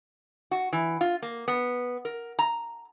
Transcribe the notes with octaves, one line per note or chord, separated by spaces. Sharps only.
F#4
E3
F4
A#3
B3
A#4
A#5